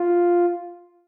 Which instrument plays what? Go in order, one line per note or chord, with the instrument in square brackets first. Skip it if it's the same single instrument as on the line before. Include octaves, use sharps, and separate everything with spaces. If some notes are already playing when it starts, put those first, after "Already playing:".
Already playing: [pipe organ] F4